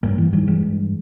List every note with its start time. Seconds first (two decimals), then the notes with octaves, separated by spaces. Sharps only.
0.03 G2 G3 A#3
0.18 E3
0.33 G2 D#3 G3
0.48 E3 G#3
0.62 G2